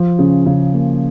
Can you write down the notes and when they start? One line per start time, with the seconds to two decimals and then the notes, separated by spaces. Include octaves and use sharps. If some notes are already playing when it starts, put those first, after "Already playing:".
Already playing: F3
0.19 C#3
0.46 C#3
0.73 A#3